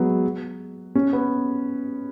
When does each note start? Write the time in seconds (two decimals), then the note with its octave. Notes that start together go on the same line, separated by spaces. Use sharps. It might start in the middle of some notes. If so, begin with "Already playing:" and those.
Already playing: F#3 G#3 B3
0.95 C#4
1.13 B3